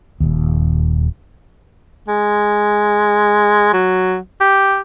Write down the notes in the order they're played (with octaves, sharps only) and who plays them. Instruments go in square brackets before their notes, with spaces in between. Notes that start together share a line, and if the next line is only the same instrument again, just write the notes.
[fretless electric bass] D#1 D#2
[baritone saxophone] G#3
F#3
G4